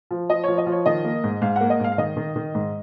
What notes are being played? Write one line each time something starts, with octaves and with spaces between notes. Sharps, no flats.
F3
F3 D#5
F3 C#5
D#5
F3
C#5
D#3 D#5
A#3
G#2
G#2 F5
A#3 F#5
D#5
G#2 F5
F5
D#3 D#5
D#3
D#3
G#2